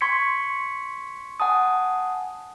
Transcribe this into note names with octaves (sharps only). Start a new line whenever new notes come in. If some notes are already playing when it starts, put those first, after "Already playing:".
C6 C#6 G#6 B6 C#7
F#5 G#5 A5 D#6